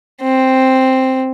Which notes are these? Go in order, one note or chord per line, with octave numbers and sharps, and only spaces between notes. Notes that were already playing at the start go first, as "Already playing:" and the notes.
C4